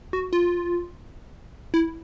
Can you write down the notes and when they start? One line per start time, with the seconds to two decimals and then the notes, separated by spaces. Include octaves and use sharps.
0.13 F#4
0.33 F4
1.74 E4